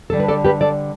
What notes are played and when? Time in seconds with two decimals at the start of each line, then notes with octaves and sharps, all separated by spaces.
0.10 D3 G3 D4 A4
0.20 B4
0.28 A4 D5
0.44 G4 B4
0.61 A4 D5